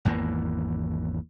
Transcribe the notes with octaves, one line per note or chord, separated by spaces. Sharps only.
G#1 E2 E3 A#3